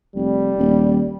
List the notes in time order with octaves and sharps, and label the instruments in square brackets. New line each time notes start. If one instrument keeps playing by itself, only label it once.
[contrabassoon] F1 [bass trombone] G3
[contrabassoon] D#1